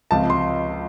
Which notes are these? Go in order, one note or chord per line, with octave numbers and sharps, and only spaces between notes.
C#2 C3 F3 A5
C6